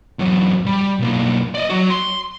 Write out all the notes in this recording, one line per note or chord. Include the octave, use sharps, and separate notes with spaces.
E2 F#3
G3
B1 A#3
D5 D#5
F#3 F#4
C6